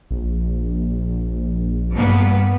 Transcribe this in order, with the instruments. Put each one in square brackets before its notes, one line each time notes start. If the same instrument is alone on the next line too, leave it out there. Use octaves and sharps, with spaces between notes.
[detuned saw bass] A#1
[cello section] G2 A#3 B3